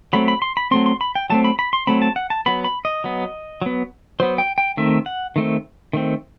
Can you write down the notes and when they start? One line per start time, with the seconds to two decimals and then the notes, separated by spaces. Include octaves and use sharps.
0.13 F#3 A3 C4 B5
0.28 B5
0.42 C6
0.57 B5
0.71 F#3 A3 C4 C6
0.86 C6
1.01 B5
1.15 G5
1.30 F#3 A3 C4 A5
1.44 B5
1.59 B5
1.73 C6
1.87 F#3 A3 C4 B5
2.02 A5
2.16 F#5
2.30 A5
2.46 F#3 B3 B5
2.64 B5
2.85 D#5
3.04 F#3 B3
3.62 F#3 B3
4.20 F#3 B3 C5
4.38 G5
4.58 G5
4.77 D#3 A3 C4 E5
5.06 F#5
5.36 D#3 A3 C4
5.93 D#3 A3 C4